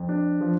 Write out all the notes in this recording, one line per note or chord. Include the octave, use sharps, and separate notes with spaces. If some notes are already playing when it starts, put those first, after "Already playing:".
Already playing: F2
D4
F3